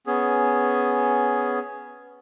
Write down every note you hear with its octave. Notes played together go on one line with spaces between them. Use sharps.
B3 C#4 G#4